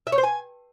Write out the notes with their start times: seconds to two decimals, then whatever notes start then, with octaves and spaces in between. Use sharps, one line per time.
0.07 E5
0.12 C#5
0.18 C5
0.23 G#5